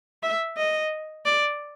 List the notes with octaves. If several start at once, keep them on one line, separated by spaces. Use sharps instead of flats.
E5
D#5
D5